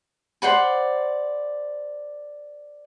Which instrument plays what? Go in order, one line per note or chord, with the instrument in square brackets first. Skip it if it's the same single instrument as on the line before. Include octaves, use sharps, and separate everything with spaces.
[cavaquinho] C5 D5 F#5 B5